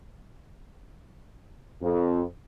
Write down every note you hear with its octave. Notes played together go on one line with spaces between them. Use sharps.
F2